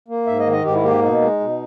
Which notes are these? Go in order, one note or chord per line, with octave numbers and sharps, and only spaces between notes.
A#3
G#2 E5
D#5
D#3
D#5
G#2 G4
E4
A#3 G4
B2 D#4
G#3
B2